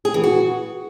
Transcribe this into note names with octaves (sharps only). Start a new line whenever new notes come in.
G#4
E3
F#4